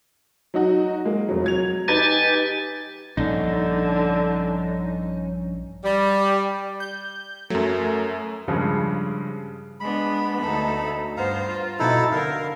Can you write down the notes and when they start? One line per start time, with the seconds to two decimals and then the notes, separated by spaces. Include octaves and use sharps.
0.54 F#3 D#4 F#4
1.05 G#3 A#3
1.28 F1 F#3
1.44 F#3 G#6 F7
1.88 D#4 G4 B4 G#5 A6 A#6
3.17 A#1 G2 D3 C#4 D#4
5.84 G3
6.80 G6
7.50 F#2 F#3 A3 A#4
8.48 G2 C#3 F3 G#3
9.80 G#3 B3 D4 B5
10.41 D2 D#4 A4
11.17 G2 B3 C5 F5 A#5
11.47 F4
11.79 B2 D#4 E4 A4 A6
12.12 D3 A#4 F5